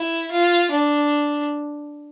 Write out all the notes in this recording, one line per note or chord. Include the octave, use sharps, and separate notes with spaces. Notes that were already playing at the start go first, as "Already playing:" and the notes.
Already playing: E4
F4
D4